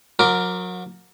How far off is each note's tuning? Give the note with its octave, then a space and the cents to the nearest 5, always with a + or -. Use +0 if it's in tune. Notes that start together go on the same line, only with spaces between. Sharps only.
F#3 -35 A#4 +0 D6 +0